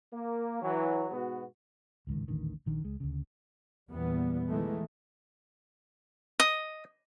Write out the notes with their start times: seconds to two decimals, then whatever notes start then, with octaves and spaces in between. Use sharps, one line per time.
0.13 A#3
0.61 E3 F#3
1.11 G#2 B2 B3 F#4
2.07 D1 C#2 G#2 D#3
2.28 D#1 A1 D3 D#3
2.66 A#1 D#3 D4
2.83 C#2 G#3
3.00 D2 C#3
3.90 E2 A#2 E3 G3 B3
4.50 D#3 E3 G#3 A3
6.40 D#5 D#6